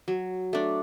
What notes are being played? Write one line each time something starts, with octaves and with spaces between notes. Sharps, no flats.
F#3
A3 D4